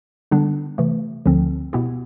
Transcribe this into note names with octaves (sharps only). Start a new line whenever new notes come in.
D3 G3 B3 D4
C3 E3 A3
D2 D3 F3 C4
B2 B3 E4 G4